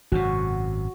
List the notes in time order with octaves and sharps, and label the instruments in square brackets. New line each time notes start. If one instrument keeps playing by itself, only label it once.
[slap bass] G#1 F#2 C3 [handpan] F#4